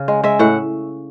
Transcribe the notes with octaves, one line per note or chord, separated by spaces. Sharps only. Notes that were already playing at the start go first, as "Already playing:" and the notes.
Already playing: C#3
G#3
G#3 E5
A2 F#5